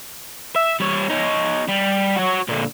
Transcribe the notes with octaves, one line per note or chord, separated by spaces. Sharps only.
E5
G3 C#5
D#4 C#5
G3
F#4 C#5
A#2 D3